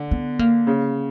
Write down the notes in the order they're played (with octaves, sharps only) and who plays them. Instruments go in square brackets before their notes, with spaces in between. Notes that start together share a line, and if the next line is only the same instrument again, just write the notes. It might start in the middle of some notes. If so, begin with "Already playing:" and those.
Already playing: [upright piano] D3
[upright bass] B3
A#3
[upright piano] C#3